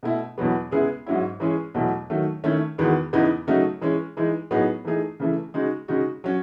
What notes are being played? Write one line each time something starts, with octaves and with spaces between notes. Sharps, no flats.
B2 A3 E4
E2 B2 F#3 B3
C#3 G#3 B3 E4 G#4
G#2 F#3 C#4 E4
E3 G#3 C#4 G#4
E2 B2 F#3 A3
D#3 F#3 A3
D#3 A3 C#4 E4
E2 D#3 G#3 B3 F#4
E2 C#3 E3 B3 D#4
C#3 F#3 A3 D#4 F#4
E3 G#3 C#4
E3 G#3 D#4
A2 F#3 B3 D#4 G#4
E3 A3 D#4 G#4
C#3 E3 A3
C#3 G#3 D#4 F#4
C#3 G#3 D#4 F#4
F#3 C#4